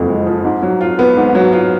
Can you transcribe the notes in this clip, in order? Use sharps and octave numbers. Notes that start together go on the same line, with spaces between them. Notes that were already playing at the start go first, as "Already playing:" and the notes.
Already playing: F#1 F2
G#3
F3
G#2
F#3
F4
B3
G#2
F#3
F4